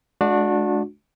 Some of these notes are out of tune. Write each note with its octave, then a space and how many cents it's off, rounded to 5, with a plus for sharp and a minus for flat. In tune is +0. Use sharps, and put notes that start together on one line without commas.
G#3 +35 D4 +0 F#4 -30